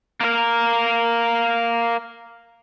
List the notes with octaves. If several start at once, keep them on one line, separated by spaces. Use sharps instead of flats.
A#3 A#4